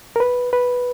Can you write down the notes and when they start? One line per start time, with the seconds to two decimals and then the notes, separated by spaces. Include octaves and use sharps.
0.16 A#4
0.20 B4
0.53 B4